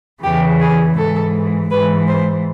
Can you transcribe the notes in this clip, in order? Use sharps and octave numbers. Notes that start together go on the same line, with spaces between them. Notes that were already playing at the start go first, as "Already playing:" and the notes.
E2 C#3 E3 G4
G#4
G#2 E3 A4
G#2 E3 B4
C5